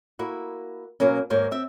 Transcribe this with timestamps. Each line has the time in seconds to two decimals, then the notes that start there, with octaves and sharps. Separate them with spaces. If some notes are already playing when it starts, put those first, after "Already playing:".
0.19 A#3 E4 F#4
1.00 B2 F#3 A#3 C#4
1.30 D#2 G#2 A#3 C5 C#5
1.51 C4 E5